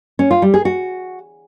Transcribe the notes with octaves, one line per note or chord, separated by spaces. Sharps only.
C#4
F4
G3
G#4
F#4